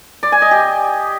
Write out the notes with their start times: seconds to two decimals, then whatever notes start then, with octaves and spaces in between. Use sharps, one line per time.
0.23 D5
0.32 G#5
0.42 D#5
0.51 G4